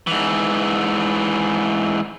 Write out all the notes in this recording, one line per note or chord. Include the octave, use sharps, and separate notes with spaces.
G#2 E3